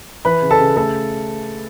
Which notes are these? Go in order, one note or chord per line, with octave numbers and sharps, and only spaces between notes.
E3 B4 B5
C#3
A4 A5
C#3
A3 A4 A5